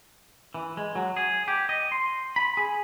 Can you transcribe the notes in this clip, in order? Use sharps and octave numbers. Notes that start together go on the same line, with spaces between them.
E3
G#3
F#3
G#4
G4
D#5
C6
B5
G#4